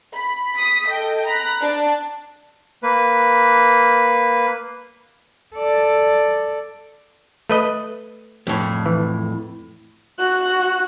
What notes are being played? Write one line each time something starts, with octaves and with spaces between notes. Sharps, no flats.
B5
D#6 B6
A4 D#5 G5
A#5 B5 F#6
D4
A#3 B4
A4 D5
A3 B4 D#5
F2 A2
E3
F#4 F#6